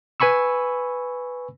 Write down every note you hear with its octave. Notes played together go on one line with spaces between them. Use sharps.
B4 G#5 B5 C#6 E6